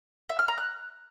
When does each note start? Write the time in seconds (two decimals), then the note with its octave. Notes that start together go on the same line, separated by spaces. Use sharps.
0.29 E5
0.39 F6
0.48 A#5
0.58 F#6